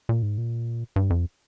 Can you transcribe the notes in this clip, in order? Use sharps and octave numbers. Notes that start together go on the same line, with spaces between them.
A#2
G#2
A#2
G2
F2